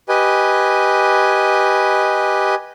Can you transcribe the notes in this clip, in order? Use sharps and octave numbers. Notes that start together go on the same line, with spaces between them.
G4 B4 D#5 G#5